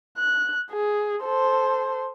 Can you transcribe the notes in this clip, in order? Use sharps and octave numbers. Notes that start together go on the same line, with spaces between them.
F#6
G#4
A4 C5